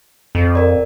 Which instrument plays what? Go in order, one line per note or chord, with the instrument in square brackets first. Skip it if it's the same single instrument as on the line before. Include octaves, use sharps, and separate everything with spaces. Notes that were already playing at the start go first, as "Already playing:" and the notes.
[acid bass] F2
[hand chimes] A#4 D5